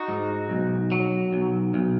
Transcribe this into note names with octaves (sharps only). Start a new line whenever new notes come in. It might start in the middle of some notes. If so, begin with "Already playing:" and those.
Already playing: D#4 F#4
G#2
B1
F#3
B1
B1